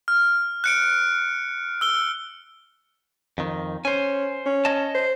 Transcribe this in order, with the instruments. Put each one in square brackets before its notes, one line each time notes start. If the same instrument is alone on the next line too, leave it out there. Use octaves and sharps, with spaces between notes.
[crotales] F6
F#6 C#7 D7
E6 G7
[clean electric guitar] F2 D#3
[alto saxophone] C#4 [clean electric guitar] C5 G#5
[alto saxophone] C#4
[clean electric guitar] C#5 D#5 A5
[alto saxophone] C5